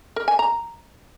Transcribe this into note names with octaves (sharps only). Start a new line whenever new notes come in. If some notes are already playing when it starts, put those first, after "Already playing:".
A#4
G#5
A#5